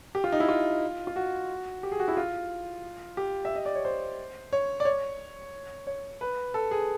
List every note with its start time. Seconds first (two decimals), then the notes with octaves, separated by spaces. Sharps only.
0.15 G4
0.24 F4
0.32 D#4
0.40 E4
0.49 F4
1.07 F4
1.16 F#4
1.83 G4
1.92 G#4
1.99 F#4
2.08 E4
2.17 F4
3.17 G4
3.45 E5
3.55 D#5
3.66 D5
3.75 C#5
3.85 C5
4.53 C#5
4.80 D5
4.85 C#5
5.87 C#5
6.21 B4
6.54 A4
6.71 G#4